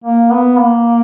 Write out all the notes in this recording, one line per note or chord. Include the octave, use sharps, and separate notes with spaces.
A#3
B3
A#3